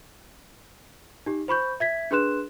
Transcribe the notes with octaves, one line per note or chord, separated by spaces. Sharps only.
D#4 G4
C5 B5 C#6 G6
E5 G#6 B6
D4 G#4 B4 C6 F#6 E7